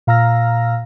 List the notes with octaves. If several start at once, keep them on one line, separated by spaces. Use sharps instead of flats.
A#2 F5 A#5 E6 F6 A#6